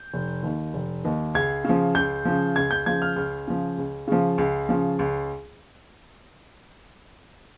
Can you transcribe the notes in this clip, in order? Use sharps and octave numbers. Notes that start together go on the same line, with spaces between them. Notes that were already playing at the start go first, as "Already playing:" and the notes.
Already playing: G6
F1
D#2 D#3
F1
D#2 D#3
C#2 G#6
C#3 F3
C#2 G6
C#3 F3
C#2 G#6
G6
C#3 F3 G#6
F6
C#2 F6
C#3 F3
C#2
C#3 F3
C#2
C#3 F3
C#2